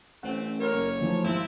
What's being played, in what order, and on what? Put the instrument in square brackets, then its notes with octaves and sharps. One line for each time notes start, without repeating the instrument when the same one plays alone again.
[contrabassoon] A1 [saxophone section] A3 C4 [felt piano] C#4 F#5
[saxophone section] D3 G3 C#5 [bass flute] A#4
[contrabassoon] F#1
[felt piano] E3 A3 D#4 [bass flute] F3
[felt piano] G#1 [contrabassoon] D#2 [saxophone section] C4 D#4 E4